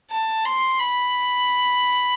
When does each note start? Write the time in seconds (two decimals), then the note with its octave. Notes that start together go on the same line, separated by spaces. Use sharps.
0.11 A5
0.45 C6
0.79 B5